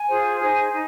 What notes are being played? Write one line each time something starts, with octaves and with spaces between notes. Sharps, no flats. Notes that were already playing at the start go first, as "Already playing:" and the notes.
Already playing: G#5
F4 G#4 C5
D#4 G#4 C5 G#5
D#4